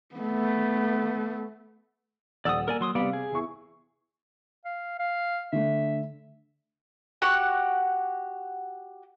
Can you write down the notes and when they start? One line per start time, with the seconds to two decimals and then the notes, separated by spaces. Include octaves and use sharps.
0.16 A3 B3
2.45 D#1 D5 F#5 D#6 E6
2.68 A#3 A#4 D5 G#5
2.81 F#3 C6 D#6
2.95 C3 G3 B3 D5 F5
3.13 G#4
3.32 E2 E4 C#6
4.65 F5
4.99 F5
5.52 D3 A3 E5
7.22 F#4 G4 F#5 C#6